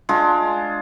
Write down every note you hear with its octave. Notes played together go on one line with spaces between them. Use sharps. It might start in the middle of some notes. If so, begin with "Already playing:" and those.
G#3 D4 F4